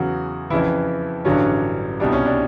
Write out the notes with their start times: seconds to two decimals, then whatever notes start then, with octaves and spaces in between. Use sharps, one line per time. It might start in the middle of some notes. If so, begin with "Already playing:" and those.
Already playing: E2 C#3 F#3 F#4
0.50 F2 C#3 E3 E4
1.25 A1 G2 D3 F#3 C#4
2.00 C2 B2 G3 D4
2.12 C#4
2.25 D4